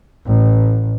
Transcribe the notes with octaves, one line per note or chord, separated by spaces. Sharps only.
A1